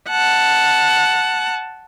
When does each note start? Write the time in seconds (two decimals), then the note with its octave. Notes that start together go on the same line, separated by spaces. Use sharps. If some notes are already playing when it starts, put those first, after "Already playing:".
0.10 F#5 A5